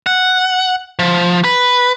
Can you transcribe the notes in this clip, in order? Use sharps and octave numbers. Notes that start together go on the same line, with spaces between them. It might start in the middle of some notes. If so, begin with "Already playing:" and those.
F#5
F3
B4